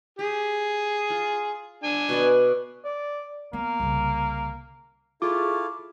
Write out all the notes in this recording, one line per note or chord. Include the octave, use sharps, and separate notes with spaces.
G4 G#4
F4
D4 G#5
B2 B3 D5
D5
A#3 B3
C2 C#3
E4 F4 G#4 A4 F5 C#6 D6